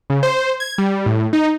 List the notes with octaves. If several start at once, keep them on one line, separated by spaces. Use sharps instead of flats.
C#3
C5
G#6
G3
A2
D#4